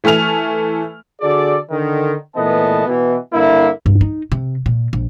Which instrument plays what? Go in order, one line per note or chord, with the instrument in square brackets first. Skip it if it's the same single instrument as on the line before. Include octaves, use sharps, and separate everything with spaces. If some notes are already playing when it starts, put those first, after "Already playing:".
[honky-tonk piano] E3 A3 G#5 F6 F7
[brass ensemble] D3 F#4 G#4 A4 D5
D3 D#3
A#2 E3 A3 B3 D#5 A5
B2 E3
G2 D3 A#3 E4
[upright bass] G2
D#4
C3
A#2
A#1